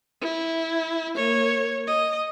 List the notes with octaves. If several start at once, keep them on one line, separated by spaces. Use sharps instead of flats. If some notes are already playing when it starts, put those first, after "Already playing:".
E4
A#3 C#5
D#5